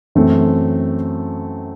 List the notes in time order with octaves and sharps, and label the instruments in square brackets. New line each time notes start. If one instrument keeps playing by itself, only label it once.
[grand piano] F#2 E3 A3 C4